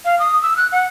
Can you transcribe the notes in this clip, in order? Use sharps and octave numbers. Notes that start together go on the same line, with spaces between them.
F5
D#6
E6
F#6
F#5